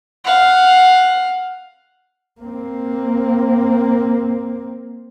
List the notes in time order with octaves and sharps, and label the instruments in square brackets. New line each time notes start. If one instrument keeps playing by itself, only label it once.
[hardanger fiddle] F5 F#5
[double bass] A#3 C4